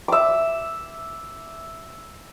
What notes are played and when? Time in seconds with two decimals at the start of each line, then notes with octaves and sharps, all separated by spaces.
0.08 E5 D6